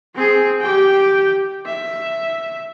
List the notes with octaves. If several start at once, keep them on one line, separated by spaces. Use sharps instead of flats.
C4 G#4
G4 G5
E5